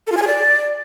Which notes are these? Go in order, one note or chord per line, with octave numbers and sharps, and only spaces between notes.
A4
F4
G#5
G#4
D5